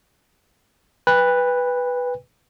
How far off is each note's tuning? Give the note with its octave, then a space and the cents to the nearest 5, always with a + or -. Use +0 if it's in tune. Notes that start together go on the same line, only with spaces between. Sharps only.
B4 +0 G5 +40